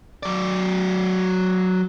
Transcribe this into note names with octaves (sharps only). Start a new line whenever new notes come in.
F#3 D5